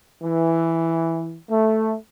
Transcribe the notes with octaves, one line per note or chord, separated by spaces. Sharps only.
E3
A3